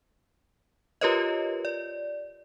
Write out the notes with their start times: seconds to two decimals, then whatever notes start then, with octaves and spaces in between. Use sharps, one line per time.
1.01 F4 G4 A#4 B4 C#5 D#5
1.65 D5